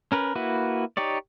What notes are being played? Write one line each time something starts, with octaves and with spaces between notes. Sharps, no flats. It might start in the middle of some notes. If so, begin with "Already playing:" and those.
C#4 A#4 B4
A#3 E4 F#4 B4
D#4 G4 C#5 D5